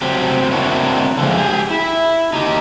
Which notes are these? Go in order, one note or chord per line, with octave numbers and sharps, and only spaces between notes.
F#3 C4 G4
C4 D4 E4 F#4 A#4 C#5
D3 E3 F3 G#3
G4 G#4
E4
D#4 G4